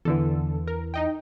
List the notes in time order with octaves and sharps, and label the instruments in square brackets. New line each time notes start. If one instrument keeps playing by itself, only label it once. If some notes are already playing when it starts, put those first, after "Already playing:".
[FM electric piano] E2 E3 [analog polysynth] D3 A4
[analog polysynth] A#4
D#4 D#5 G5